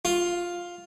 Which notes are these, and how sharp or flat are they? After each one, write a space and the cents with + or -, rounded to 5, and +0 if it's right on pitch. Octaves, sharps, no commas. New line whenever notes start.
F4 +5